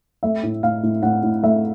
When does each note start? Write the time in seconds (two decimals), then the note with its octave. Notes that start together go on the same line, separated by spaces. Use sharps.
0.23 A3 E5
0.43 A2
0.63 A2 F5
0.83 A2
1.03 A2 F#5
1.23 A2
1.43 A3 E5